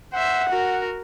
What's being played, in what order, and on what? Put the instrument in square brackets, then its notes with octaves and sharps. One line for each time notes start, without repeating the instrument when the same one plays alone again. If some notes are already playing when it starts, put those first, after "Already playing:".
[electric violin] C5 E5 [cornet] F#5
[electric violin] F#4 A#4